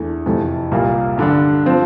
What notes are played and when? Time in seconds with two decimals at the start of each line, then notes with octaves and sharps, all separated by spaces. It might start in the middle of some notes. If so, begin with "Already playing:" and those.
Already playing: E2 E3 A3 D4
0.26 F2 C3 E3 A3
0.72 C2 A#2 G3 A#3
1.17 G2 D3 G3 D4
1.66 F3 C4